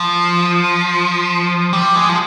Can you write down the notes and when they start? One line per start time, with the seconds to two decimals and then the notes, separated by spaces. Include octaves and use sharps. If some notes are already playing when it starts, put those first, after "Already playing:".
Already playing: F3
1.73 G3
1.96 G#3
2.09 F3